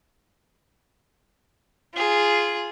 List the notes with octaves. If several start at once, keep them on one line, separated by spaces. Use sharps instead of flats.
F4 G#4